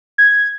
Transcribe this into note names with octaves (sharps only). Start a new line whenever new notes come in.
G#6